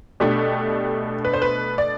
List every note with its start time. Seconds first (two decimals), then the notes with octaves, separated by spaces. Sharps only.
0.20 B2 A3 D4 G4
1.25 B4
1.33 C5
1.42 B4
1.78 D5